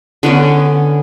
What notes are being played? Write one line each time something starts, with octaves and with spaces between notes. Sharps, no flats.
D3 B3 C#4